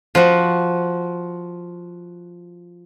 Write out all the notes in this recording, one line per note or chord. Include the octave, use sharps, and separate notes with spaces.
F3 F#4